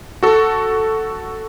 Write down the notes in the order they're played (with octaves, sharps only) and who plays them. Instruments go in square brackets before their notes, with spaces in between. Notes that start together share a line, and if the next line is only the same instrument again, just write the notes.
[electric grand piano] F#4 A4